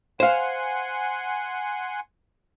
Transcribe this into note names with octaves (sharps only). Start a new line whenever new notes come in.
C5 F5 F#5 G#5 C6